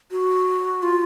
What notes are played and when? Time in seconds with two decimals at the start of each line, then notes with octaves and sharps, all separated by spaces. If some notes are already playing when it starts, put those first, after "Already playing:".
0.11 F#4
0.83 F4